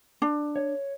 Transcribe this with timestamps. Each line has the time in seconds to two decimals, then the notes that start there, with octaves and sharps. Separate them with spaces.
0.22 D4
0.56 C#5